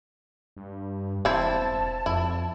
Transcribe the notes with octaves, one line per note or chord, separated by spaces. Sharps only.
G2
E1 C4 E4 A5
F2 E4